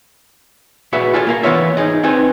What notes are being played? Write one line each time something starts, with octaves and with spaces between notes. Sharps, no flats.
A#2 F#4 G#4 B4 E5
F4 G#4 A4 D#5 A5
A#3 A#4 F5
E3 B3 F4 B4 C#5 E5
D#4 G#4 D#5
C4 D#4 B4 D#5 G#5